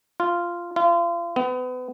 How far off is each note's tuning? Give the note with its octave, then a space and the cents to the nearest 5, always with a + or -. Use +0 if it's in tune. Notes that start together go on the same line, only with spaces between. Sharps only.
F4 -10
F4 -35
B3 +35